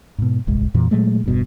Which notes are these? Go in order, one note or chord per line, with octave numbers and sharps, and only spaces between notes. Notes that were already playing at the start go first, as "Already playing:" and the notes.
G#2 B2
D1 G1 C2 G#3
F2 A#2 E3
A#2 F#3 G#3 A3
E1 G2 B2